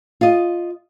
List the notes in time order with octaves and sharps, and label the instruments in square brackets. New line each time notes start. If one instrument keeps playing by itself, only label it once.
[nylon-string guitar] F4 D#5